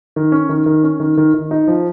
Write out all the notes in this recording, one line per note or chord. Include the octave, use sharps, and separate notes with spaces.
D#3
C#4
D#3
D#3
C#4
D#3
D#3
D#3
D#4
F3